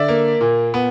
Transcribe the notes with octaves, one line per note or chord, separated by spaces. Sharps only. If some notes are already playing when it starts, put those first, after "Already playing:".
Already playing: D3 D5 E5
A#3
A#2
B3